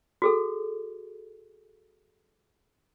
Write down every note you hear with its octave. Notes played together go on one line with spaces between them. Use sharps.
F#4 G#4 A4